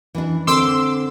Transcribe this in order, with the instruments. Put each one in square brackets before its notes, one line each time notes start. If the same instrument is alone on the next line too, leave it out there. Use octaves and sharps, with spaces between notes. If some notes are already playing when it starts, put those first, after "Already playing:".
[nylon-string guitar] E3 D4
[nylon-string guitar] D3 C4 [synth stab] C6 D6 E6